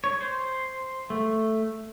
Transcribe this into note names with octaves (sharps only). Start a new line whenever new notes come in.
C#5
C5
A3